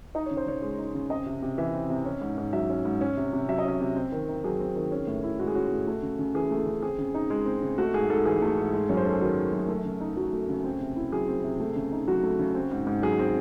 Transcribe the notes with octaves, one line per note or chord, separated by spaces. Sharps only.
D#4 D#5
C#3 C#5
C5
C#3 C#5
G#3
D#4
C#3
C4 D#5
C3
C3
E3 E5
C4
C3
C#4
G#2
G#2
F#3 E5
C#4
G#2
C#4
C3
C3
F#3 E5
D#5
C#4 E5
C3
C4
D#3
D#4
F#3 G#4
C4
D#3
C#4
A2
E4
G#3 F#4
G#4
C#4 F#4
A2
A3
C#3
C#3
E3 G#4
A3
C#3
C4 G#4
C#3
D#4
G#3
C4
C#3
A3 F#4
G#2 G#4
G#2 A4
E3 G#4
A3
G#2
G#3
F#2 C#5
C5
C#4 A4
G#4
D#3 F#4
G#3
F#2
A3
C#3
D#4
F#3 F#4
A3
C#3
C4
C3
E4
F#3 G#4
C4
C3
A3
C#3
D#4
F#3 F#4
A3
C#3
C4
G#2
G#2
F#3 G#4
C4